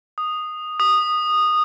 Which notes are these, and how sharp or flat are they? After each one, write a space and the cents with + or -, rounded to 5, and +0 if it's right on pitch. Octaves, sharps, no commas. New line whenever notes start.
D#6 -10
D#6 -15